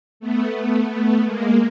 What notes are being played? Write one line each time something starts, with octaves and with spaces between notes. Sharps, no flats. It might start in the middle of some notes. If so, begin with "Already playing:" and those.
A3 B3
A3 B3
A3 B3
G#3 A#3